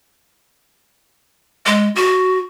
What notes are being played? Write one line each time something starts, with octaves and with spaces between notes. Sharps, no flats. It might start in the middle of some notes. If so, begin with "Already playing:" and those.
G#3
F#4